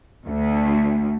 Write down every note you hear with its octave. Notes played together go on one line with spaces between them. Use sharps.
D2